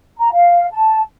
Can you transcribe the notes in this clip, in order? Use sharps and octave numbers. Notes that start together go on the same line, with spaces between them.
A#5
F5
A5